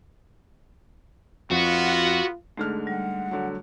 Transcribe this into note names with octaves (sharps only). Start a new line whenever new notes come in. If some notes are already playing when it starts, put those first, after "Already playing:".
F2 B3 F4 F#4
G#2 D3 A3 G#4 F6
G3 F#5
D3 F#3